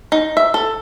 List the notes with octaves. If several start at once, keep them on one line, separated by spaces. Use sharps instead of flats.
D#4
E5
A4